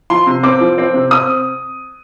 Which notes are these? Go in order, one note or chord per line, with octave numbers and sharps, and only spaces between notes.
F3 C6
C3
C4 D6
F3
C4
C3
C4 D#6